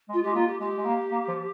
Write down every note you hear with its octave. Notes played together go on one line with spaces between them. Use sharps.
G#3
F4
G#3 G4
A#3 F4
G4
G#3 G4
G#3
A#3
A#3
F3